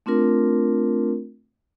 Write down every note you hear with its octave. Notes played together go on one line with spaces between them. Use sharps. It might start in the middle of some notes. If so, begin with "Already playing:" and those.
A3 C4 D4 F4 A#4